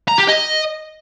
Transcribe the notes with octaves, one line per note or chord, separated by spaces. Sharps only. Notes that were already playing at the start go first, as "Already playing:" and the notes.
A#5
G4
D#5